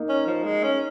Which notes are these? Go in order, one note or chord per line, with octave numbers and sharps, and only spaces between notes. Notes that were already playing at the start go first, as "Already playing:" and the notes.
Already playing: A#3 D#4
C#4
F3
G#3
C#4